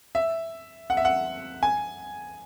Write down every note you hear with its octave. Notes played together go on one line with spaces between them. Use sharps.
E5
F#5
E5
F#5
G#5